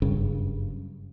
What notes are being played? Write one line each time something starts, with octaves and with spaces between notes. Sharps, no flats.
F#1 G2 C#3